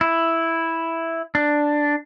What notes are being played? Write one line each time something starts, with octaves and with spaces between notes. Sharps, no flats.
E4
D4